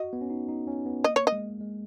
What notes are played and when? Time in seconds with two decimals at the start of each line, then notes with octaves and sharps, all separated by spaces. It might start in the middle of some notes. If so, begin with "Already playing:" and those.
Already playing: F#4 D#5
0.13 B3
0.21 C#4
0.30 D#4
0.48 D#4
0.67 C#4
0.86 B3
1.04 A#3 D#5
1.16 C#5
1.27 D#5
1.32 G#3
1.61 G#3